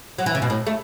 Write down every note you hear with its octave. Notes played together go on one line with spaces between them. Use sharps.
F#3
E3
C#3
B2
A2
A3